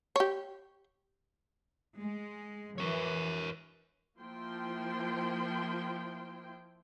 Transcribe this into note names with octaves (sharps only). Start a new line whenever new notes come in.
G4 C#5
G#3
E3 A#4 C#5
F3 A#3 E4 G5 C6